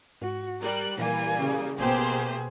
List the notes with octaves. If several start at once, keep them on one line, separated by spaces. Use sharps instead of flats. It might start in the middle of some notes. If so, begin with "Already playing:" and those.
G#2 F#4
G3 A#4 F#6
A#2 E3 G3 A#3 G#5
C#3
G#1 B2 A#3 G4 G#4 C5